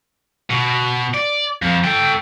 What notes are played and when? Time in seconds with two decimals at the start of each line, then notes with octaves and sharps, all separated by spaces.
0.50 B2
1.14 D5
1.62 F2 F3
1.85 A4 G5